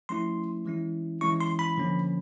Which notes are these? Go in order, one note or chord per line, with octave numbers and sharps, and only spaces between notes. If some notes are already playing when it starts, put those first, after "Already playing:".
F3 A3 C#4 E4 C6
E3 G#3 C#4 E4
E3 G#3 C#4 E4 C#6
C6
B5
D3 F3 A#3 C#4